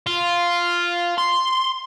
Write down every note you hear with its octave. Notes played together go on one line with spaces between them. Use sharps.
F4
C6